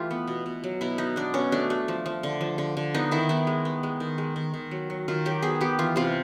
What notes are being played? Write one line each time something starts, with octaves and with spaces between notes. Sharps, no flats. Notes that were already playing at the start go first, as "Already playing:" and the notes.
Already playing: E3 A3 F4 G4
B3
B2
B2
F#3
B2 E4
B3 D#4
B3 D4
B2 C#4
A3 D4
A3
F3
F3
D3
F3
D3
D3
B3 D#4
D#3 E4
B3 E4
G#3
B3
G#3
D#3
G#3
D#3
D#3
F#3
F#3
D#3 F4
F#3 G4
B3 G#4
B3 G4
E3 F4
C3 F4